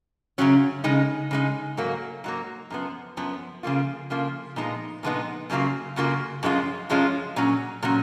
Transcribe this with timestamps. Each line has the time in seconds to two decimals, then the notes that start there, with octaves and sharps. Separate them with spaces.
0.38 F#2 C#3 F#3 C#4
0.84 C#3 G#3 D#4
1.31 C#3 G#3 D#4
1.77 G#2 F#3 A#3
2.24 G#2 F#3 A#3
2.71 F#2 F3 B3
3.17 F#2 F3 B3
3.63 C#3 F3 A#3 F4
4.10 C#3 F3 A#3 F4
4.56 A#2 F3 G#3 B3 D#4
5.03 A#2 F3 G#3 B3 D#4
5.50 F#2 C#3 F#3 A#3 F4
5.96 F#2 C#3 F#3 A#3 F4
6.43 F#2 F3 G#3 C#4 F4
6.89 F#2 F3 G#3 C#4 F4
7.36 A#2 F#3 C#4
7.83 A#2 F#3 C#4